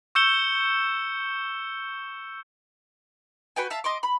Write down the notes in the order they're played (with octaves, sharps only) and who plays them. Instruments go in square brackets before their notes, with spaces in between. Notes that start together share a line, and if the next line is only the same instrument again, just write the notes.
[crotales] C#6 E6 G6 C#7 E7 G7
[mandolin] F#4 B4 G5 G#5
E5 F5 A5
D#5 C6 D6
B5